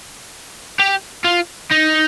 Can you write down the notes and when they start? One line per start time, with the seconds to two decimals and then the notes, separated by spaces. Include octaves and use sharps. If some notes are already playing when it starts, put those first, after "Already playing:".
0.79 G4
1.25 F4
1.71 D#4